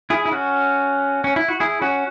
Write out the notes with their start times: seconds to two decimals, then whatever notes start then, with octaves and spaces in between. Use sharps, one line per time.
0.10 E4 G#4
0.26 E4
0.32 C#4 F#4
1.24 C#4
1.36 E4
1.48 F#4
1.60 E4 G#4
1.81 C#4 F#4